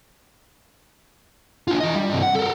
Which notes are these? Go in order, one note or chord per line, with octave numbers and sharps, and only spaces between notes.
D4 F4
E3 D#5
G3
G2 C3
F#5
A4 A#4